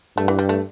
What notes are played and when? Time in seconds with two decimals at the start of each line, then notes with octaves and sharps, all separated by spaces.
0.17 G2 A3
0.28 E3
0.39 G3
0.49 A3